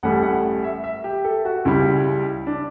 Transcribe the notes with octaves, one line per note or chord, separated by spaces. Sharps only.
A1 A2 G3 F#5
F#5
E5
E5
G4
A4
F#4
C#2 C#3 G3 E4
D4